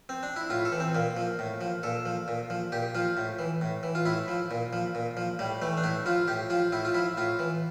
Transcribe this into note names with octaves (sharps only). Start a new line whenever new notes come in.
C4
D4
E4
A2 F4
A4
E3
C4
A#2 A#3
F3
A2
F3
A#2 A4
F3
A#2
F3
A#2 G4
F3 F4
A2
E3
A2
E3
F4
A2 E4
F3
A#2
F3
A#2
F3
A2 G3
E3 A3
D4
A2 E4
F3 F4
A2 G4
F3 F4
A2 E4
F4
F3 E4
A2 F4
E3